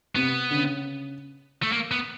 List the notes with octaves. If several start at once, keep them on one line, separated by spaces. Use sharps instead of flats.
C3 B3
D3
C#3
A3
A#3
B3